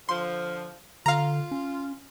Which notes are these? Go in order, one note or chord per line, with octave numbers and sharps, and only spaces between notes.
D3 F3 C6
D3 F4 F5 A#5
C#4